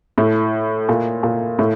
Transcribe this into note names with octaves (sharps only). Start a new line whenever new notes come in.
A2
A#2
A#2
A2